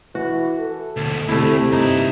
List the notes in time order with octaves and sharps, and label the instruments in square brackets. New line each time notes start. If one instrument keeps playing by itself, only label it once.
[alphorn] E3 [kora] F#4
[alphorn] A4
[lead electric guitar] D2 B2
[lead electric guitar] D2 [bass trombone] C3 [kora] A3 E4
[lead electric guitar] G2 E4 [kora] D#4